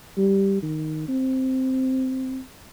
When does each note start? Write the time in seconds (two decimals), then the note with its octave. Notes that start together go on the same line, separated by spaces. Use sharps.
0.17 G3
0.62 D#3
1.08 C4